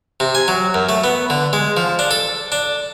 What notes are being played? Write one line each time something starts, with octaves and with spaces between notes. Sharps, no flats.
C3
G#5
F#3
F#2
A3
B3
D3
G#3
F3
D4
A4
D4